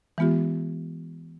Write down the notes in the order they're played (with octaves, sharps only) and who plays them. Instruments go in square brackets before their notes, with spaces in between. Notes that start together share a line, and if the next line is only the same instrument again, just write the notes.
[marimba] E3 G#3 B3 F4 G4